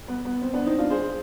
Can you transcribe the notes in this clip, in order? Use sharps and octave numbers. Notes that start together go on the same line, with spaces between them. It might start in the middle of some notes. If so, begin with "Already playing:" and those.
B3
B3
C4
B3 D4
C4 D#4
D4 F4
G#4 C5